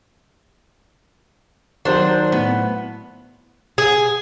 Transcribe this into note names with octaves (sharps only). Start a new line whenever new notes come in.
D#3 F#3 D4 C5
A2 B3
G#4